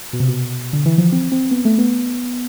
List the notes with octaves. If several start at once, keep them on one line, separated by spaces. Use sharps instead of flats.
B2
C3
B2
D3
E3
F3
C4
C4
B3
A3
B3